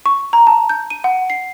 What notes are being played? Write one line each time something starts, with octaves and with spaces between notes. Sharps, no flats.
C#6
A#5
A5
G6
D#7
F#5
C7